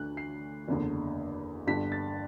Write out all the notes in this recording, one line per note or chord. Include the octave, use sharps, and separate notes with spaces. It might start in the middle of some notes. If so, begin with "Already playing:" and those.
Already playing: D2 D3 F#6
C7
F#1 E2 D3
G1 G2 D3 B6
A6